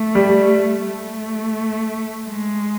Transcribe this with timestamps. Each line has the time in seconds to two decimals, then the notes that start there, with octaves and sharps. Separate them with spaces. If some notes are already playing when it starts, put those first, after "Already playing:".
Already playing: A3
0.15 G3
0.87 A3
2.28 G#3